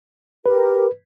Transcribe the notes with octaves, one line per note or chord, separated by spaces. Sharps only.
G4 A#4 B4